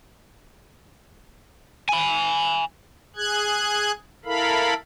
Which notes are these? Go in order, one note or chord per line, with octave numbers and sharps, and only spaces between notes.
G#5 B5
G#4 F#6 G#6
E4 A4 A#4 F5 B5